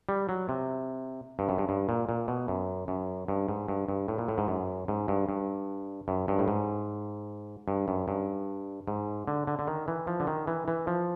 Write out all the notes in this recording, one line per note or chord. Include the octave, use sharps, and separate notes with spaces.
G3
F#3
C3
G2
F#2
G2
G2
A#2
A#2
B2
F#2
F#2
G2
G#2
G2
G2
A2
A#2
A2
G#2
F#2
G#2
G2
G2
F#2
G2
A2
G#2
G2
F#2
G2
G#2
D3
D3
D3
D#3
E3
F3
D3
D#3
E3
E3
F3